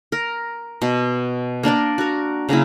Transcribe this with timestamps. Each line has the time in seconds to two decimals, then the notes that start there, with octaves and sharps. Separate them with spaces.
0.12 A#4
0.82 B2
1.63 A#3 D4 A#4 D5
1.98 F#4 A#4
2.49 C#3 F#3 A#3 E4